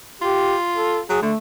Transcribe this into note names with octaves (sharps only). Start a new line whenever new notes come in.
F4 G4
A4
F#3 G#4
D3 A3